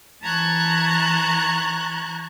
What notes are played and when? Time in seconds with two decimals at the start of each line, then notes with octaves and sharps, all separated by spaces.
0.24 E3 A5 A#5 C#6 F#6 G#6